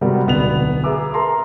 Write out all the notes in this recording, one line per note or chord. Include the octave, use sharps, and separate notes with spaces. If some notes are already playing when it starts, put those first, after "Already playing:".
C3 G3 G#3 B3 F#4 A#4
D1 B1 B3 F7
G#4 B4 E5 A#5 D6 E6
A#4 A5 A#5 C6